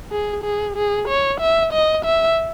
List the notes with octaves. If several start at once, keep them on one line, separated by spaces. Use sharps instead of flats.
G#4
G#4
G#4
C#5
E5
D#5
E5